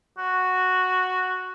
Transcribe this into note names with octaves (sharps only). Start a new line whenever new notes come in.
F#4